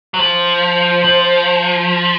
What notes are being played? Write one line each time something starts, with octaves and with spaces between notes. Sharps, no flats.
F#3
F3 C5
F3